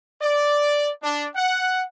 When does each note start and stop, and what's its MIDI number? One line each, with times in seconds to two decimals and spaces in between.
0.22 0.90 74
1.03 1.28 62
1.36 1.83 78